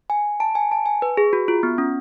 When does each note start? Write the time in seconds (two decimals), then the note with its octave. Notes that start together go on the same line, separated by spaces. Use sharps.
0.10 G#5
0.40 A5
0.55 G#5
0.71 A5
0.86 G#5
1.02 B4
1.17 G#4
1.33 F#4
1.48 F4
1.63 B3
1.78 C#4